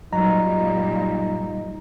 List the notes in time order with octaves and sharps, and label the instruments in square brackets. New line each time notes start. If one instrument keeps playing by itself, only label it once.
[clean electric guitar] F#2 F#3 [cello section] A#2 G3 [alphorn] D#4 [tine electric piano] D#5 A#5